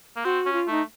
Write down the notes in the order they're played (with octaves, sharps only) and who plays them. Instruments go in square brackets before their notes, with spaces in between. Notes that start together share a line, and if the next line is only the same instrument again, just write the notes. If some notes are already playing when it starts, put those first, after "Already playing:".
[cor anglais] A#3
[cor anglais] C4 [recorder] F#4
[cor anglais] C#4
[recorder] F4
[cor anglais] A3 [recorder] D#4